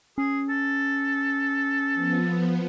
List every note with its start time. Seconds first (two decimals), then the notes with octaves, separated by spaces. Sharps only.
0.18 C#4 G#4
0.49 A4
1.94 F3 B3